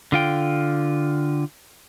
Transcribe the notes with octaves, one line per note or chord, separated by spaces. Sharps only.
D3 F4 G5